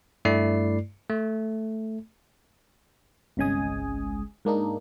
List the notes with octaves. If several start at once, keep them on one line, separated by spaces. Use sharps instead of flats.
G2 A3 E4 D5 C7
A3
G1 C2 C#3 G#3 G#5 D#6
G#2 A#3 D4 D#4